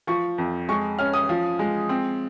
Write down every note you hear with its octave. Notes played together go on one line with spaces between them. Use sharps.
F3 C#6
F2
G#3 C#6
C#4 F6
D#6
F3
G#3
C4